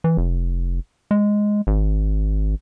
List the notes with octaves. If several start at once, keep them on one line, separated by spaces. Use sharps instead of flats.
E3
F1
G#3
G#1